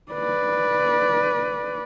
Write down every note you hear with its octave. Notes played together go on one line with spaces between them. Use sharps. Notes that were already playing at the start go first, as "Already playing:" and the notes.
B4 D5